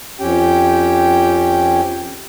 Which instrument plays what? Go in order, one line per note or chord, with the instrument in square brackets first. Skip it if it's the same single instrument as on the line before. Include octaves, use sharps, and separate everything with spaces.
[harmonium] F2 C#4 G4 G5